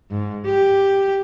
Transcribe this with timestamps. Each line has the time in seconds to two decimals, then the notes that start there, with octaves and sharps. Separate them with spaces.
0.11 G#2
0.45 G4